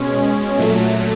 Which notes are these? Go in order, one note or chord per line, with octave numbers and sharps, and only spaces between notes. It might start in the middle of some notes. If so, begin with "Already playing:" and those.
Already playing: B2 G#3 C#4
A#2 F#3 A3